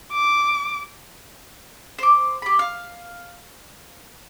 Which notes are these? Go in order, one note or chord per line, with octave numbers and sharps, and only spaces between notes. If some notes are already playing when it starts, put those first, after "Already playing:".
D6
C5 D6
G4 B5
F5